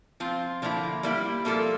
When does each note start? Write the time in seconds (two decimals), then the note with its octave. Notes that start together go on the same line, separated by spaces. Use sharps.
0.20 F3 C4 F4
0.62 D3 F3 A#3 E4
1.03 G3 A#3 E4
1.45 F3 A#3 F4 A4